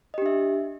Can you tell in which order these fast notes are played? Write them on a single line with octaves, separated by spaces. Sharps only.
D#5 G4 D4 E5